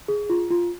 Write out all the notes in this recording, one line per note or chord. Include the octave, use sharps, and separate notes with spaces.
G#4
F4
F4